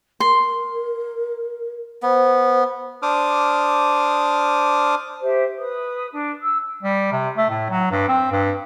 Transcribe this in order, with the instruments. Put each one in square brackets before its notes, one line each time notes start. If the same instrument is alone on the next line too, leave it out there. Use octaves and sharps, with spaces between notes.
[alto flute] A#4 [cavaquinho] C6
[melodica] B3 [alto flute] C5
[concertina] D4 C5 D6 D#6 F6
[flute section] G4 C5 E5
B4 D#6
D4
E6
[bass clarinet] G3
C3
A3
A2
F#3
G2
C4
G2